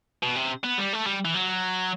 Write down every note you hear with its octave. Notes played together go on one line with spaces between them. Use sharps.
B2
C3
B3
G3
A3
G3
E3
F#3